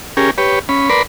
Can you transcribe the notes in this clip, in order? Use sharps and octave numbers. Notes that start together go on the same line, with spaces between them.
C#4 G4 G#4 A#4
G4 B4 C#5
C#4 B5
A#4 B4 D5 B5 C6